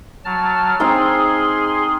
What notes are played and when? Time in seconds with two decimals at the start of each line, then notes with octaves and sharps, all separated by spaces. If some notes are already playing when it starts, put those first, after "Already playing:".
0.25 F#3 A5 F6
0.80 C4 D#4 G#4 A#4 C6